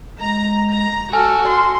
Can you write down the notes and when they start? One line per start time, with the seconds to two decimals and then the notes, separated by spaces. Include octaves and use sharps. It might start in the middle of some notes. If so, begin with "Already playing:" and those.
0.21 G#3 A#5
0.72 A#5
1.13 F#4 A4 G#5 F6
1.47 C6